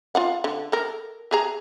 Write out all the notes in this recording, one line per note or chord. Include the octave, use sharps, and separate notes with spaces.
F4 F5 F#5
D3
A4 A#4
G4 G#4 A#5